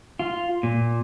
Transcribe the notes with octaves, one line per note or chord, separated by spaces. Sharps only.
F4
A#2